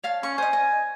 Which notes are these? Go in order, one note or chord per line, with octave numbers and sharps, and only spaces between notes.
C#5 F5 A5
C#4 C#6
C5 D#5 G#5
D#5